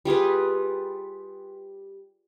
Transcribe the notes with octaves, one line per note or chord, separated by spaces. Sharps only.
G3 F4 G#4 B4